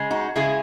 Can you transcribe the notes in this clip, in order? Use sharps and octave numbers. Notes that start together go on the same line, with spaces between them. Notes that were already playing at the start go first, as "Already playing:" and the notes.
Already playing: C#3 G#3
D#4 F#4
C#3 G#3 E4 G#4